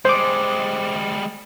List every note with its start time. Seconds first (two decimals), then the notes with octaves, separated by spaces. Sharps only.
0.05 G3 G#3 C5 D6